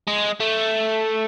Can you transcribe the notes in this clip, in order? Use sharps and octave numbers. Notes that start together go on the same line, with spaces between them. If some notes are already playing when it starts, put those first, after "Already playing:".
G#3
A3